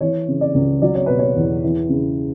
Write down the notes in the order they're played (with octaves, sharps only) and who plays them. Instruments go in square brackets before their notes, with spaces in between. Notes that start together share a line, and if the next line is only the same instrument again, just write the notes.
[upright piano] E3 C#5
C#3
D5
C#2
F#3 D5
C#5
B2 B4
C#5
E2
E3
C#3